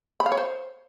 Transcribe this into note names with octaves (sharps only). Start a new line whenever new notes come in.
B5
F5
C#5
C5